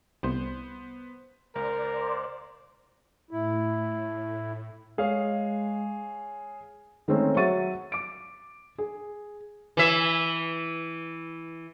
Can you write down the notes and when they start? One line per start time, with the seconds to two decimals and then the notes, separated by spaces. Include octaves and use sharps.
0.23 C2 B3 C5 C6
1.55 C#2 A#4 C5 D5
3.31 A2 E4
4.98 G#3 G#4 C#5 F5
7.08 D#3 G#3 A3 C4 C#4 D#4
7.36 F#3 E5 C#6 A6 D#7
7.92 D6 D7
8.78 G#4
9.77 E3 E5